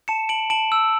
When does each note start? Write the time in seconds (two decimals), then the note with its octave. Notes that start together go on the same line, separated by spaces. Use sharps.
0.08 A5 C#7 E7
0.29 A5 D7 F#7
0.50 A5 D7 F#7
0.72 E6